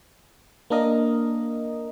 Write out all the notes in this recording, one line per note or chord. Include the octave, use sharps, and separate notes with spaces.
A#3 D4 A#4 D#5